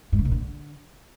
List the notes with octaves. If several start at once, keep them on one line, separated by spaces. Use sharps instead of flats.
G#2
C#3
A#2
D3